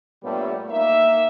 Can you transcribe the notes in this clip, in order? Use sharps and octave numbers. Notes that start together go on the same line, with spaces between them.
G2 A#2 G3 A3 B3 C#5
A#3 D#4 E5